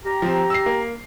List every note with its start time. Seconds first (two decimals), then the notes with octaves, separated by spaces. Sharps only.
0.05 G4 A#5
0.22 F3 C4
0.50 E6 C7
0.66 A#3